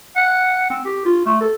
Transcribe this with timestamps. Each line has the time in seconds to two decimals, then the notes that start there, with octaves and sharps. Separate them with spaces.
0.16 F#5
0.70 C4
0.85 G4
1.05 F4
1.25 A3
1.40 A4